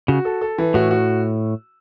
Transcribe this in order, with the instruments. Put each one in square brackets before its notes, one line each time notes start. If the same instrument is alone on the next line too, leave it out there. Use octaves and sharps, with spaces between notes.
[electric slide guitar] C#3 [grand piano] F#4
[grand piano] A4
A4
E3
[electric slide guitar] A2 [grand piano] F#4
[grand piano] F#4